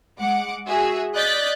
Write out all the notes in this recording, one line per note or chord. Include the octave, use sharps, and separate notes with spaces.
G#3 F#5 D6
F#4 G#4 E5
D5 D#5 F#6 G6 A6 B6